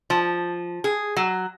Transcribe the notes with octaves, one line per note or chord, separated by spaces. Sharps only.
F3
G#4
F#3